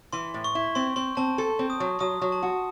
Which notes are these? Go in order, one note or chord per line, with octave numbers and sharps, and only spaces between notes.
E3 C6
A2
C#6
E4
C4 C6
C4 C6
C4 A5
A4 C6
C4
D#6
F#3
F#3 D#6
F#3
A5
F#4